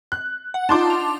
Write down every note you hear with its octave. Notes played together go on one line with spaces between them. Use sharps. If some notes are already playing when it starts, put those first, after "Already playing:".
F#6
F#5
D4 D#4 F4 A5 C6 D6
F7